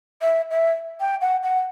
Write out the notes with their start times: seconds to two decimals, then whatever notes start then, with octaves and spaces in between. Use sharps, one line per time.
0.21 E5
0.51 E5
1.00 G5
1.21 F#5
1.43 F#5